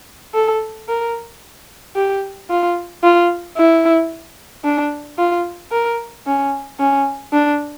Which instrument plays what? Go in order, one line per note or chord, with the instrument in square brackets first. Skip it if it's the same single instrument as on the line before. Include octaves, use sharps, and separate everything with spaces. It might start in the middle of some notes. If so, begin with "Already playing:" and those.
[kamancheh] A4
A#4
G4
F4
F4
E4
D4
F4
A#4
C#4
C#4
D4